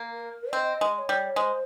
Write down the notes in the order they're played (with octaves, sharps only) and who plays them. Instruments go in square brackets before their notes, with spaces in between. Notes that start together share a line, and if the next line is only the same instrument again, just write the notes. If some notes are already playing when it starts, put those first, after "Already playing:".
Already playing: [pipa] A#3
[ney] A#4
[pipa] C4 [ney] D#5
[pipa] G#3
[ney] D#5
C#5
[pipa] G3
[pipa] G#3 [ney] C5